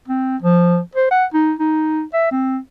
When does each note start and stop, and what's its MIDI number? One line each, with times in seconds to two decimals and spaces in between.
0.08 0.37 60
0.42 0.79 53
0.95 1.11 72
1.11 1.25 78
1.34 1.54 63
1.59 2.03 63
2.13 2.29 76
2.32 2.58 60